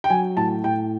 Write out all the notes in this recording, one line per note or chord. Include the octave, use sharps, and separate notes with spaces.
G5
F#3 G#5
A2 A5
A2 G5